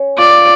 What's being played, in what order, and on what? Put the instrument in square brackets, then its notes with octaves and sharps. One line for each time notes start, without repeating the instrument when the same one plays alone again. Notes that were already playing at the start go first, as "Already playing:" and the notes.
Already playing: [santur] C#4 C#5
[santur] F4 [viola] D5